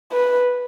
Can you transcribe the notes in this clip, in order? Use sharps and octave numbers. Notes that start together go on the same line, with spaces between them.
B4